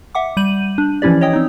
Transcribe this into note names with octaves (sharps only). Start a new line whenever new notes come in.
E5 F#5 D6
G3 G6 D#7 F#7
D4
E3 F3 C#4 E4 G4 D5
C#5 D#5 G5 D#6
C4 D#4